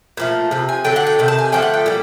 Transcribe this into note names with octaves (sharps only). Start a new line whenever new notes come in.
A#2 F3 A3
C3 F3
G#5
D3 F#3 A3 G5
F#5
G5
C3 D#3
A5
G#5
D3 F3 A3 G5
F#5
G5
A#2 G3